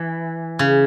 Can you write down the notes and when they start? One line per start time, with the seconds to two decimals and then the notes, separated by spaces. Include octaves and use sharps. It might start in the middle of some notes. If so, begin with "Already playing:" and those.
Already playing: E3
0.59 C#3